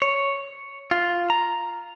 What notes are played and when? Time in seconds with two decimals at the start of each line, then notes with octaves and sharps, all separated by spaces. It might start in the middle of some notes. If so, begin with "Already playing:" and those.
0.02 C#5
0.91 F4
1.30 A#5